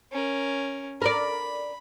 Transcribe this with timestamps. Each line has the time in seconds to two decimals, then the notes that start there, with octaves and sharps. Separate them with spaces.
0.12 C#4 A#4
1.02 A#4 B4 D5 B5